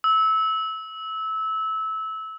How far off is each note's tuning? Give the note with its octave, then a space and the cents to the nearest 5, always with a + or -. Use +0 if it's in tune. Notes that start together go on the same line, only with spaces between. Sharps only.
E6 -20